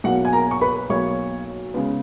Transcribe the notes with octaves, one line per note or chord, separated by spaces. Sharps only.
B1 B2 A#3 F#4 F#5
G#5
A#4 A#5
C#6
B4 B5
B1 B2 A#3 C#5 C#6
C#3 G#3 B3